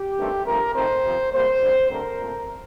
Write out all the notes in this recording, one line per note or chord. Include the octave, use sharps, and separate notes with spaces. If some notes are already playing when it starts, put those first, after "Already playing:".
Already playing: G4
G2 D#3 A3 C4
G2 F3 A3 C4 A#4
F2 D#3 A3 C4 C5
C3 F3 C4
C3 G3 A#3 C5
D3 G3 C4
G2 D3 A3 C4 A#4
A#2 A3 C4